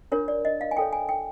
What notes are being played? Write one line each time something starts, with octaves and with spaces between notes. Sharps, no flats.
D4 F4 A#4 C#5
D5
D#5
F5
G#5
F4 A4 C#5 G5
G#5
G5